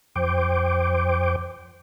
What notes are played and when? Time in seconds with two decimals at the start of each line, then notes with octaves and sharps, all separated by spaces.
0.16 F2 C5 G5 D6